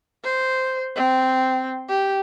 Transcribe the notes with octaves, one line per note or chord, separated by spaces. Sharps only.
C5
C4
G4